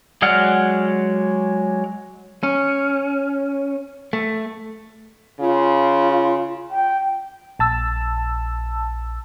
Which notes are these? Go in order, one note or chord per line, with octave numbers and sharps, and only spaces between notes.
F#3 G#3 D5 F#5 F6
C#4
A3
C#3 F4
G5
A#1 A5 E6